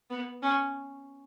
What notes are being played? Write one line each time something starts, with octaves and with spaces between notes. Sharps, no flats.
B3
C#4